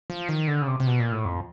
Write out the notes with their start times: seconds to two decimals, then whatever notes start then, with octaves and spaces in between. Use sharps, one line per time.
0.10 F3
0.29 D#3
0.48 D3
0.62 C#3
0.67 C3
0.80 C3
0.87 B2
1.00 A#2
1.12 A2
1.25 F2